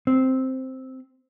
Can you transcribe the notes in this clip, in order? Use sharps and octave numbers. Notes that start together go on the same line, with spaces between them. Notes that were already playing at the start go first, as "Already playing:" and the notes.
C4